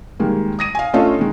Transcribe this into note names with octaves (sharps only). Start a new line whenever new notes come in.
D#3 G3 G#3 A#3
D#6 A#6 D#7
F5 G#5
A3 C#4 D4 F4 A4 D#5
D#3 G#3